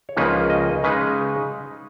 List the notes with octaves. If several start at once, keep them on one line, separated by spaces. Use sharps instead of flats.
C#5
C#2 C#3 F3 A#3 D#4 B4
D#5
C#3 G#3 D#4 B4